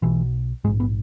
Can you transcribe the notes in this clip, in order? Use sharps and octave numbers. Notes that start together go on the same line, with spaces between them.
B1 B2 E3
A#1 G#2 G#3
B3